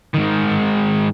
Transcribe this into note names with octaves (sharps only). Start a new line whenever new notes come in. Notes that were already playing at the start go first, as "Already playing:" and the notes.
G#2 D#3